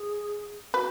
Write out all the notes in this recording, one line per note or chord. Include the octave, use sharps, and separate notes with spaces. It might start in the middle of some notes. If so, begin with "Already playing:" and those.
Already playing: G#4
F#4 B4